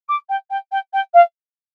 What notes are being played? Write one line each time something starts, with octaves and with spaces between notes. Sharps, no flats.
D6
G5
G5
G5
G5
F5